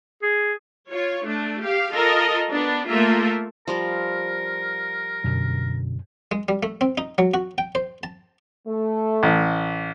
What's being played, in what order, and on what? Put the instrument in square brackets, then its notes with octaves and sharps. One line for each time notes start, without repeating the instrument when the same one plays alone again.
[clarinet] G#4
[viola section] F4 C#5
A3 D4
G4 F5
F4 A4 A#4 D#5
B3 D4
A3 A#3 F4 A4 A#4 E5
[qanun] F3 G3 F4 [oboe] A#4
[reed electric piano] F#2 [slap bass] B2 D3
[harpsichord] G#3
G3
A3
C4
D#4
F#3
F#4
G5
C5
A5
[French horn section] A3
[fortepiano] A1